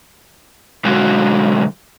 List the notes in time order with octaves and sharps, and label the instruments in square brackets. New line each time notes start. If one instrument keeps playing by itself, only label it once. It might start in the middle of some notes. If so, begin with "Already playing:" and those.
[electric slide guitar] B2 D3 F#3 G#3 F#4